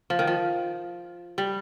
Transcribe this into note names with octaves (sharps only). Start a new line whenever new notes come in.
F3
D#3
F3
G3